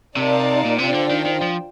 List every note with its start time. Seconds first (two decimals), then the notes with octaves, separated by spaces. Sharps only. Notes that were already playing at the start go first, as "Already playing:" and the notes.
0.16 C3 D#4 A#4 D5 F5 A5
0.65 A#2
0.79 C3 D4 F4 C5 G5
0.94 D3
1.10 D#3
1.26 D#3
1.42 F3